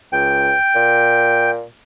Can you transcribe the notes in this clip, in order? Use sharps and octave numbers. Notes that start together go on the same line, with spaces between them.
C#2 G5
A#2